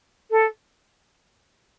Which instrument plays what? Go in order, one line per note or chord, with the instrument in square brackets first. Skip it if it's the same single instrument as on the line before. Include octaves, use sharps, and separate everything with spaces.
[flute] A4